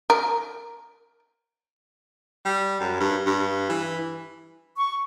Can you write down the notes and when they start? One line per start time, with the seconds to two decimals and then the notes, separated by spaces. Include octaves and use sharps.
0.10 A#4
2.45 G3
2.80 F#2
3.00 G2
3.26 G2
3.69 E3
4.76 C#6